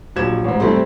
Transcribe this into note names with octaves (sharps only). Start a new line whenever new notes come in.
A#1 F#3 G4 G#6 E7
A1 G#2
C3 G3 A3 C4 C6